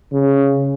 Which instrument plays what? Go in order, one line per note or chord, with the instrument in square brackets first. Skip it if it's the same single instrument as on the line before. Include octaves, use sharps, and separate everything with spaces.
[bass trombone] C#3